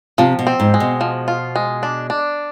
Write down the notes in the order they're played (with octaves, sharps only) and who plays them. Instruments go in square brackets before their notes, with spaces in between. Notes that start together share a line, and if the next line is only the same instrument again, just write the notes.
[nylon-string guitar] C3 [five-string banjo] F3
[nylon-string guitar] B2
[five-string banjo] C4
[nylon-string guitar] G#2
[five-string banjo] G#3
[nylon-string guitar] B2
[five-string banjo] F3
F4
G#3
D4
D4